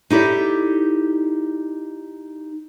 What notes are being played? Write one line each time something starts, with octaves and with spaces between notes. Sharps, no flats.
D#4 E4 G4 A4 D5